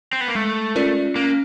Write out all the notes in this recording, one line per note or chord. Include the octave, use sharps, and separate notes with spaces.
C4
B3
A#3
G#3 A3
C#4 F4 A#4 D5
A#3 C#4